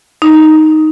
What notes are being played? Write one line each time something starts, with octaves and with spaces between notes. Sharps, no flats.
D#4